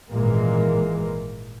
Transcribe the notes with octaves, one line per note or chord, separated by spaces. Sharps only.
G#1 A#2 E3 G#3 A#3